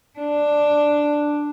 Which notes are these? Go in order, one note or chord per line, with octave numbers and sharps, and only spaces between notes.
D4